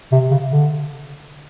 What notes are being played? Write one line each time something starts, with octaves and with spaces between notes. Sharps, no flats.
C3
C#3
D3